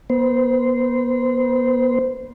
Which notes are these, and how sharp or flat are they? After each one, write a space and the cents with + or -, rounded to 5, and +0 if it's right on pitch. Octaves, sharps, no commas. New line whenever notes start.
B3 -35 C5 -20